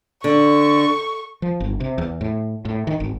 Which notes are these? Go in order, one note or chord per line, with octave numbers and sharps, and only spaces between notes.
D3 C#6
F3
G1
C3
E2
A2
A2
D#3
G#1